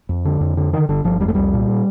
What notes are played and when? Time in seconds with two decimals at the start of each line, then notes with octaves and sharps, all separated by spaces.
0.09 F2
0.25 D3
0.41 F2
0.57 D3
0.73 D3 D#3
0.89 G1 D3
1.04 G1 F3
1.21 F2 G3
1.28 A3
1.35 C2 G3
1.53 A#2